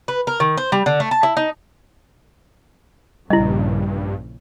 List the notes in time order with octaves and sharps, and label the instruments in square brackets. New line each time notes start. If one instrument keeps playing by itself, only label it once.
[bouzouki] B4
A#4
D#3
C5
G3
D3
A3
A5
E4
D#4
[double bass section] A#1 C#3 [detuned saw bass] G2 [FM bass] G3 [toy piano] E4 D#5